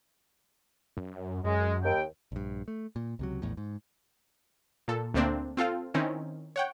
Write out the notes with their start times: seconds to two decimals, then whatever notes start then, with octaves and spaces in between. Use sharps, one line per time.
0.97 F#2
1.44 F#2 G#3
1.84 D#2 G5
2.32 A#1 G2
2.68 A3
2.96 A#2
3.19 C#2 C3 F#3
3.42 A#1 E2 A2
3.57 G#2
4.88 A#2 A4
5.14 D2 A3 A#3 C4 D4
5.57 C4 F4 A4 F5
5.94 D#3 C4 C#4 D#4 E4
6.56 C#5 F#5 G5